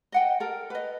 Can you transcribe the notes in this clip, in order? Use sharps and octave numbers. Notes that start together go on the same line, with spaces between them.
D#5 F#5 G5
A4 A#4
B4 D#5